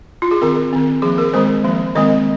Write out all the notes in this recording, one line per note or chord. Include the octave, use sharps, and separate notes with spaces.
F4
G#4
D#3 C4 A#4
D#3 C4
F3 A#3 G#4
A#4
D#3 G#3 C4 C5
F3 A#3
D#3 G#3 C4 D#5